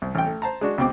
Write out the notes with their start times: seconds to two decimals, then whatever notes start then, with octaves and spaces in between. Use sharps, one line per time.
0.02 C2
0.15 A1 G5
0.27 A3
0.42 C5 A5 A#5
0.61 G#3 D4 F#4
0.78 C#2 B2 C4 G5 D6